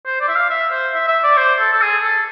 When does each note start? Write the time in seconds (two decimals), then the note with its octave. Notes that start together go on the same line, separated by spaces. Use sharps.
0.06 C5
0.21 D5
0.28 E5
0.35 F5
0.50 E5
0.72 C5
0.94 E5
1.08 E5
1.24 D5
1.37 C5
1.59 A4
1.73 A4
1.82 G#4
2.04 A4